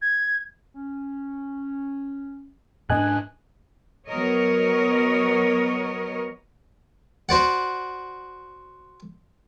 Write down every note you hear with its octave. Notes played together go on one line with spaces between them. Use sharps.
G#6
C#4
G#2 C4 D4 D#5 G#5 F#6
F#3 B3 A#4 C#5 D#5
F#4 C5 D5 F#5